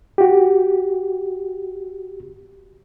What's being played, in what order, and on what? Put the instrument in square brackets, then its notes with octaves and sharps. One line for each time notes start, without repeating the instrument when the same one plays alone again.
[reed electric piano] F#4 G4